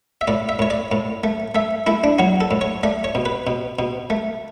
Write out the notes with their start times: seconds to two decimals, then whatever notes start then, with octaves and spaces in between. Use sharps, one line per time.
0.21 E5
0.28 A2 D5
0.49 E5
0.59 A2 C#5
0.70 D5
0.92 A2
1.24 A3
1.55 A3 E5
1.87 A3 E4
2.04 D4
2.19 F#3 F#4
2.41 A4
2.51 A2
2.61 C#5
2.83 A3 D5
3.04 C#5
3.15 B2
3.25 B4
3.47 B2
3.79 B2
4.10 A3